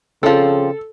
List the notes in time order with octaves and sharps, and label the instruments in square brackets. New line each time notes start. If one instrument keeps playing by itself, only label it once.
[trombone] C#3 [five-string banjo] F3 C4 [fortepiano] A4